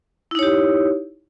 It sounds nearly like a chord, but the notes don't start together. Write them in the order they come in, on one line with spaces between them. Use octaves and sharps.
E4 D#4 C#5 G4